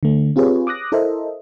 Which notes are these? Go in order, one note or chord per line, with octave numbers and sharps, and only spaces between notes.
D3 A3
C4 F4 G4 G#4 B4 C#5
D6 D#6 F#6 A#6
E4 A4 A#4 C5 D#5 E5